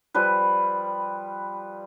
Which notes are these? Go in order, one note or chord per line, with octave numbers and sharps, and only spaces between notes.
F3 G3 B4